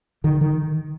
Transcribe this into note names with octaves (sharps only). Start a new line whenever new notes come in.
D3 D#3
D#3